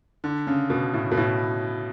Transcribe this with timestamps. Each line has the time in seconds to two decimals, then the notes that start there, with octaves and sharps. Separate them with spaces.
0.24 D3
0.47 C#3
0.70 B2
0.93 A2
1.11 B2
1.17 A2